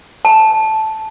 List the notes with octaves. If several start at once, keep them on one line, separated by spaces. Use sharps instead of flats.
A5